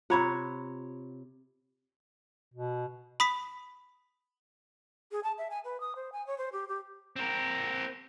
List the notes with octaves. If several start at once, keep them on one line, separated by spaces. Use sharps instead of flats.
C3 F4 C#5 F#5 A#5 B5
B2
B5 D#6 B6
G#4
A5
E5
G#5
B4
D#6
C5
G#5
C#5
C5
G4
G4
C4 A#4